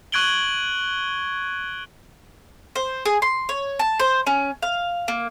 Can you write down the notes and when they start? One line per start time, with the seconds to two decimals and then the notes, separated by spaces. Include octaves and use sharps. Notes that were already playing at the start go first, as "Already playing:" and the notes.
0.12 C#6 F#6 G#6 D7 F#7 G7
2.76 C5
3.05 G#4
3.22 C6
3.49 C#5
3.79 A5
3.99 C5
4.27 C#4
4.62 F5
5.08 A#3